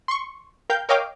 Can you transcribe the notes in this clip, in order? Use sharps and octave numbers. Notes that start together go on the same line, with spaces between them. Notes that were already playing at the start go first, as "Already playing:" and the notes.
C6 C#6
A#4 F5 G5 G6
A#4 C#5 D#5 F5 G5 D6